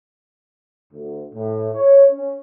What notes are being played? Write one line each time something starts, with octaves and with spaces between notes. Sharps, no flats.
D2
A2
C#5
C#4